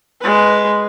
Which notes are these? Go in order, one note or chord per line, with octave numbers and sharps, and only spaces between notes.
G#3 B4